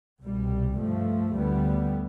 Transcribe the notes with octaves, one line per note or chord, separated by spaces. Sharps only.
C2 B2 G3
G2 F3 A3
D2 D3 G3 B3